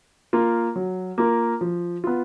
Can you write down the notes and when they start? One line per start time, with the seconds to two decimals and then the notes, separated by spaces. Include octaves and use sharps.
0.33 A#3 F4 A#4
0.76 F#3
1.18 A#3 F4 A#4
1.61 F3
2.04 B3 F4